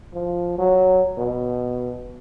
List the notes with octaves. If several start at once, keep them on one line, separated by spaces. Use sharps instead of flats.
F3
F#3
B2